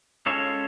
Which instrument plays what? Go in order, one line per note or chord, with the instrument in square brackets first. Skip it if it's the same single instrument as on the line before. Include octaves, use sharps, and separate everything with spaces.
[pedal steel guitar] G#3 C#4 F4 A4 C#5